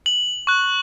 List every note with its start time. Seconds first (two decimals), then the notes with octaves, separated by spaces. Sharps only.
0.06 F#7
0.47 C#6 F#6